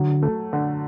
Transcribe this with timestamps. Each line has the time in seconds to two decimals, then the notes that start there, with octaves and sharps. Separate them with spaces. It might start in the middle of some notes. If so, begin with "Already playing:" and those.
Already playing: D3 F#3
0.23 A3
0.53 D3